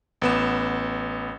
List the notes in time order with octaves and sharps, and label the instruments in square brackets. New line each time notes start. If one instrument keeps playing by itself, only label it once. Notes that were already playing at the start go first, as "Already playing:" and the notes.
[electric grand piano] A1 B3 E7